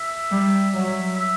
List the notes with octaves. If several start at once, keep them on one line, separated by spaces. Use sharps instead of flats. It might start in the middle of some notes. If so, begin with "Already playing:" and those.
Already playing: E5
G3
F#3
E5